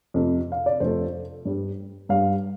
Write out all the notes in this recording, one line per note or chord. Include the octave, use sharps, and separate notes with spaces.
F2 C3 A3
F5
D5
F2 C3 A3 C5
G2 G3
G2 G3 F5